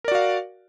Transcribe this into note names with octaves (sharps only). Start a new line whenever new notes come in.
F#4 A#4 D5 F5